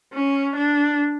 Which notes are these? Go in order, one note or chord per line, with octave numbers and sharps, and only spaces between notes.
C#4
D4